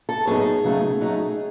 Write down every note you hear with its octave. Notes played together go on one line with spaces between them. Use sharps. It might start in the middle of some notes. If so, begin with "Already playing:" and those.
A4
A2 F#3 B3 D#4 G#4
C#3 F#3 A3 D#4
F#3 A3 D#4